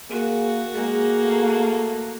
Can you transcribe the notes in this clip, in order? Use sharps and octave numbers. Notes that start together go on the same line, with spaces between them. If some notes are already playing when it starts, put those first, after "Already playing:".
A#3 F#4 G#4
G#3 A#3 G#4
A3